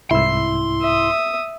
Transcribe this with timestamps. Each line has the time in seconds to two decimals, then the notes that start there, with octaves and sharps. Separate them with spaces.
0.11 C2 G#2 E4 C6 E6
0.81 E5 D#6